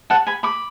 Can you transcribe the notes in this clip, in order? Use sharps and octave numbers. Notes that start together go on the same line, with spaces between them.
F#5 A5
G#5 B5
B5 D6